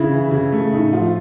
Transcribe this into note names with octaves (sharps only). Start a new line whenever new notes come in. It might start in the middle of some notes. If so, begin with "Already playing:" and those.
Already playing: C#3 E4
E3
C#3
A3
A2 D#4
F3 F4